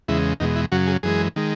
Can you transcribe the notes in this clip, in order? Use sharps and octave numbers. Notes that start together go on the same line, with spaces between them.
E2 C#3 G#3 E4
E2 B2 G#3 D#4
E4
F#2 C#3 F#3 F#4
G#4
F#2 E3 G#3 G#4
D#3 G#3